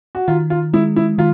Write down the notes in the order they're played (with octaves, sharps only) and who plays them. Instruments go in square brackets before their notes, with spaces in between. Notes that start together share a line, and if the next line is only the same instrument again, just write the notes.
[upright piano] F#4
[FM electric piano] D#3 [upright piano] F4
[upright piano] F4
[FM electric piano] G#3 [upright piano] E4
[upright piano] E4
[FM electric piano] D#3 [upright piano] F4